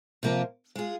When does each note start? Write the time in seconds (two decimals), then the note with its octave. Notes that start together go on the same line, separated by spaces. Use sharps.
0.23 C3 F3 A#3 F4 A#4
0.76 G#3 F4 G#4